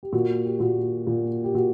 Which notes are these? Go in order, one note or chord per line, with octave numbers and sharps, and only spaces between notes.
G4
A#2 F#4
G4
A#2 F#4
A#2
G4
A#2 F#4